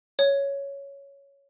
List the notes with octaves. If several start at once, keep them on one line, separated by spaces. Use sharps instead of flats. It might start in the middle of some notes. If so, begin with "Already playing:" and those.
C#5